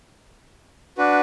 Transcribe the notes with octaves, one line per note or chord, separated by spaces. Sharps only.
D4 F#4 B4